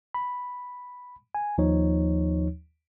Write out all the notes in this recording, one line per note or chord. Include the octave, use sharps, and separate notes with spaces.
B5
G#5
D#2 F3 D#4 C#5